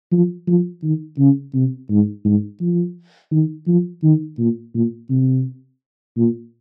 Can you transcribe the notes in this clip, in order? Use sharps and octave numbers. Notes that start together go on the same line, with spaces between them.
F3
F3
D#3
C#3
C3
G#2
G#2
F3
D#3
F3
D#3
A#2
A#2
C3
A#2